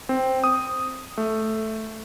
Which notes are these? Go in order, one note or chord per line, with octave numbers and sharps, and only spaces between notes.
C4
D#6
A3